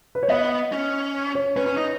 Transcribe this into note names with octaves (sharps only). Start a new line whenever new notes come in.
B4
C#5
B3 D#5
C#4
C#5
C#4 B4
C#4
D#4